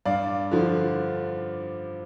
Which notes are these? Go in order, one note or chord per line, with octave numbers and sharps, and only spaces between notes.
G2 D5 F5
D3 F3